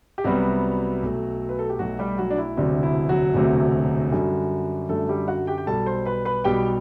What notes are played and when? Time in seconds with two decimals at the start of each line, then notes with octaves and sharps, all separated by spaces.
0.18 G4
0.24 C2 C3 F#3 G3 B3 F#4
1.03 B1 B2 A3
1.49 B4
1.59 A4
1.70 G4
1.79 B1 B2 F#3 A3 F#4
1.99 G3 G4
2.18 F#3 F#4
2.30 D4
2.38 E4
2.57 E1 D2 C3 F#3 A3 D4
2.83 E4
3.09 F#3 F#4
3.34 E1 D2 C3 F#3 A3
4.12 F#2 D3 G3
4.89 F#2 D3 G3 A3 A4
5.09 G3 G4
5.28 F#4 F#5
5.47 G4 G5
5.58 G5
5.67 B1 B2 G3 A4 A5
5.86 C5 C6
6.05 B4 B5
6.25 B4 B5
6.44 B1 B2 G3 G4 G5